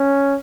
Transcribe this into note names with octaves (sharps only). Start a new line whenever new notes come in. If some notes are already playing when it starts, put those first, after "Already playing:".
Already playing: C#4